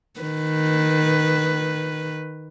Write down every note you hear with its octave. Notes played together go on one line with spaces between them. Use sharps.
D#3 B4